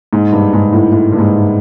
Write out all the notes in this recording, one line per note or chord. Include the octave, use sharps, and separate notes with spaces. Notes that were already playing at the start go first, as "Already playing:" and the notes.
G#2
G2
G#2
A2
A2
G2
G#2